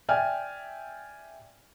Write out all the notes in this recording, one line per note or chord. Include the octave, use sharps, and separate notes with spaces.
D5 E5 G5 G#5 F6